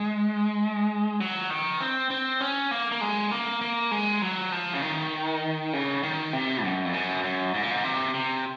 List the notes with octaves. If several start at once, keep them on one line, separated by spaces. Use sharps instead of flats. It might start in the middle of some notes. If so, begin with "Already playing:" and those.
Already playing: G#3
F#3
D#3
C4
C4
C#4
A#3
A#3
G#3
A#3
A#3
G#3
F#3
F3
C#3
D#3
C#3
D#3
C3
F#2
F2
F#2
F#2
G#2
A#2
G#2
C3
C3